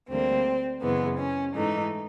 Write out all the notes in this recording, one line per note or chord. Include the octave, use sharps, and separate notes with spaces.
D2 D3 G3 A#3 C4
F#2 C#3 E3 G#3 B3
C#4
G#2 E3 A3 D#4